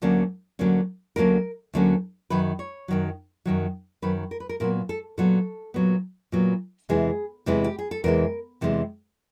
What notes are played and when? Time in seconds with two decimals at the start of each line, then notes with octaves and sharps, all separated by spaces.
0.02 D2 D3 F#3 A#3 C#4
0.59 D2 D3 F#3 A#3 C#4
1.16 D2 D3 F#3 A#3 C#4 A#4
1.74 D2 D3 F#3 A#3 C#4
2.30 F#2 D#3 F#3 B4
2.59 C#5
2.88 F#2 D#3 F#3
3.45 F#2 D#3 F#3
4.02 F#2 D#3 F#3 B4
4.31 A#4
4.40 B4
4.49 A#4
4.60 A#2 F#3 B3 A#4
4.89 A4
5.18 A#2 F#3 B3 A4
5.74 A#2 F#3 B3
6.32 A#2 F#3 B3
6.89 E2 C3 E3 G#3 G#4
7.46 E2 C3 E3 G#3
7.64 G4
7.79 G#4
7.91 A4
8.04 E2 C3 E3 G#3 A#4
8.61 E2 C3 E3 G#3